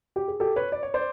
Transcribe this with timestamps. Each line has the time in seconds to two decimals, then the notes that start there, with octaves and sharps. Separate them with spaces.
0.16 G4
0.28 G#4
0.40 G4 A4
0.56 B4 C#5
0.72 D5
0.83 C#5
0.94 C5 D5